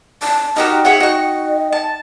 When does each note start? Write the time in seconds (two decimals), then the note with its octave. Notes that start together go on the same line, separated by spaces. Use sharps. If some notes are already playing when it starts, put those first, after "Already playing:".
0.22 A5
0.56 D#4 F#4 G4 A#4 D#5 G5
0.85 G#4 C#5 E5 F#5
1.00 F#4 D#5 C#6
1.73 A5